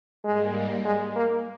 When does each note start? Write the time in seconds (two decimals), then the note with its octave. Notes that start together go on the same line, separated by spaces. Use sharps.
0.24 G#2 G3 G#3 A#3
0.85 G#3
1.16 A#3